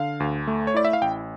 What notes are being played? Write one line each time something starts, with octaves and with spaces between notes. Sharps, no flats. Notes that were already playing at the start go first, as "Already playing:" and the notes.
Already playing: D3 F5
D2
A3
C#5
E4 D5
E5
F5
A1 G5